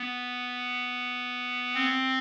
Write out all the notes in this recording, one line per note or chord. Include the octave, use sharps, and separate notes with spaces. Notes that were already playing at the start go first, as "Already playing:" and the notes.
Already playing: B3
C4